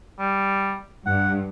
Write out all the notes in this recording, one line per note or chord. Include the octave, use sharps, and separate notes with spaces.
G3
G2 F#5